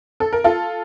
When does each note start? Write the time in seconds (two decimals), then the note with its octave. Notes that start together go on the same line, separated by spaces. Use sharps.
0.20 A4
0.33 A#4
0.44 F4 A4